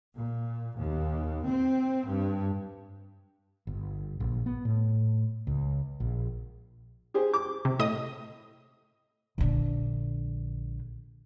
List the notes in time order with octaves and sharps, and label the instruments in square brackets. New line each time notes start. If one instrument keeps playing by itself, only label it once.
[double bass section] A#2
D#2
C4
G2
[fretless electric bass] G1
A#1
B3
A2
C#2
A#1
[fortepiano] G4 G#4 C5
D6
[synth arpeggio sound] C3
A2 D#5 D#6
[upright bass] A#1 D3